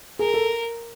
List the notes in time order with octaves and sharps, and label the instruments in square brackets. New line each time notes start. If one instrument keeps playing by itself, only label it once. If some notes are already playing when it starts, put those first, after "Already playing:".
[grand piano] G#4 [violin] A#4
[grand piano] A4